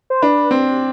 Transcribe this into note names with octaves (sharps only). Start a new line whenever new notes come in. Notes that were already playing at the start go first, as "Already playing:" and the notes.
C5
D4 B4
C4